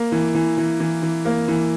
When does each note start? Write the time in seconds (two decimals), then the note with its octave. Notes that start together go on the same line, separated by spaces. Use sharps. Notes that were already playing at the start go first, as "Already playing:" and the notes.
Already playing: A#3
0.12 E3
0.35 E3
0.57 E3
0.80 E3
1.03 E3
1.25 A#3
1.48 E3